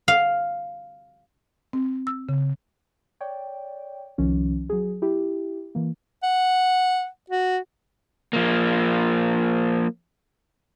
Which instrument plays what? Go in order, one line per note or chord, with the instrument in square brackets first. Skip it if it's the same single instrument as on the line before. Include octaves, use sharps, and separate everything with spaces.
[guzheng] F5
[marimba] C4
E6
C#3
[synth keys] C#5 D5 G5
C2 D#3 F3 C#4
F#3 G#4
E4 G4
E3 A#3
[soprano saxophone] F#5
F#4
[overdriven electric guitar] F3 A#3